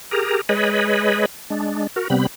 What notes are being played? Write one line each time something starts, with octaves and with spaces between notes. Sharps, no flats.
G4 G#4 A#4 A#5
G#3 G#4 B4 C#5 D#5 B5
G#3 D4
F#4 A#4
C3 G3 B3 C4 B5